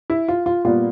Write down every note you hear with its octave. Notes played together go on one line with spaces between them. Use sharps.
E4
F4
F4
A#2 G3 B3 F4